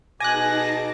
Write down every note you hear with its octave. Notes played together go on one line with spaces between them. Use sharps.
B2 D#4 G#4 G#5 A5 D6 F#6 A#6